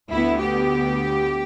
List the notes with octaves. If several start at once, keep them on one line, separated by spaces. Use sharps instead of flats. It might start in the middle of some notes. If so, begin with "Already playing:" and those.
D2 D3 B3 E4
G4